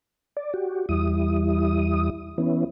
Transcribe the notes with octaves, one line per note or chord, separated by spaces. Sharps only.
D5
F#4 G4
E2 G3 E4 D#6
E3 B3 C#4 E4